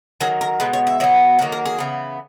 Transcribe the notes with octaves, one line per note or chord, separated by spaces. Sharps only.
D#3 F#3 A#3 G#4
A#4
B2 G#3 B3 B4
C#5
E5
B2 F#3 B3
D#3 F#3 A#3 F#4
A#4
G#4
C#3 E3 B3